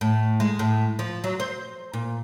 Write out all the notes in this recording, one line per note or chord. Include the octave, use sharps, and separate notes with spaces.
A2
G#3
A2
F3
F#3
C5
A#2